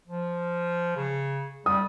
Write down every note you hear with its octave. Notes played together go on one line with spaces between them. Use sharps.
F3
C#3
G3 D#6